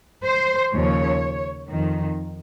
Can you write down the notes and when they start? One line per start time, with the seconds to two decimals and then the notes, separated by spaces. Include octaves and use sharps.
0.24 C5
0.73 D#2 C#3 F3 C#5
1.69 F2 D#3